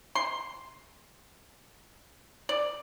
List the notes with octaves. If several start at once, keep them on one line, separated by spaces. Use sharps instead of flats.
C6
D5